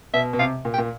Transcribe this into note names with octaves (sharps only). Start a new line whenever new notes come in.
B2 E5
B2
C3 F5
A#2
G5
A#2